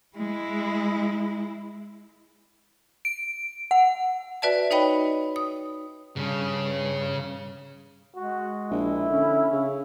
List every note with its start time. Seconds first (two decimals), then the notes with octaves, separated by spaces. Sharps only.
0.17 G#3 E4
3.05 D7
3.71 F#5
4.42 F#4 B4 D5 E5 A5
4.71 D#4 B4 C#5 D#5 G5 B5
5.36 D#6
6.16 G2 C#3
8.16 G#3 F#4
8.71 A#1 E4
9.10 D3 C#4
9.52 C#3